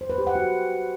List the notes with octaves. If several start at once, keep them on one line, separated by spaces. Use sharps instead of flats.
C5
B4
G4
F#5
F#4